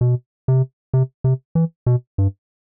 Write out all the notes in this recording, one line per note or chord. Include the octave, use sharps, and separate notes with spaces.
B2
C3
C3
C3
E3
B2
G2